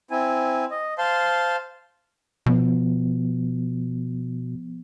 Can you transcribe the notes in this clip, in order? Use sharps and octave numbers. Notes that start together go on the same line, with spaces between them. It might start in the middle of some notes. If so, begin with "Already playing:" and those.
C4 E4 G#5
D#5
C5 F5 A5 C6
B2 F3 B3